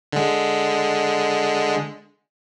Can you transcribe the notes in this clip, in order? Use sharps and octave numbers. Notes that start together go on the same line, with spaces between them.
D3 G#3